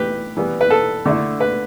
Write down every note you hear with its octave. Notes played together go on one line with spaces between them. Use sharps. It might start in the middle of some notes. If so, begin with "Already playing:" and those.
Already playing: E3 A3 G4 B4
E3 G3 B3
B4
A4
D3 A3 E4
B4